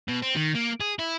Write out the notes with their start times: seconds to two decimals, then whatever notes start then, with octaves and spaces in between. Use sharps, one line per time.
0.08 B2
0.22 C4
0.36 D#3
0.55 A#3
0.81 G#4
0.99 E4